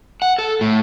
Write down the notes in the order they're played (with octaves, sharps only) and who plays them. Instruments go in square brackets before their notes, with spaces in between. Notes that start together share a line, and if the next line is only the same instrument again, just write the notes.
[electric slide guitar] F#5
A4
A2